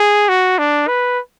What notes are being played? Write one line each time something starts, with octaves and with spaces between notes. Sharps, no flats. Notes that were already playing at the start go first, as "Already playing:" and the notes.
Already playing: G#4
F#4
D4
B4